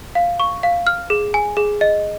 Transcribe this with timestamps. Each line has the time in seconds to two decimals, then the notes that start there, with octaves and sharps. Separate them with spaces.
0.15 F5
0.40 C#6
0.63 F5
0.87 F6
1.10 G#4
1.34 G#5
1.57 G#4
1.81 D#5